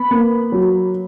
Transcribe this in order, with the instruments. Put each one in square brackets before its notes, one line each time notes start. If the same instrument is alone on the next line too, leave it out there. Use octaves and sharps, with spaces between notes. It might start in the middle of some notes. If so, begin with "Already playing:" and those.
Already playing: [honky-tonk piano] B3 B5
A#3
F#3